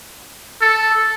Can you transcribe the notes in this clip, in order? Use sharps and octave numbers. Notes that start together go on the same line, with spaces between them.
A4